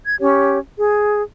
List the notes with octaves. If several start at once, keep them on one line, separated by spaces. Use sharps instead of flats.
G#6
C#4 G4 C#5
G#4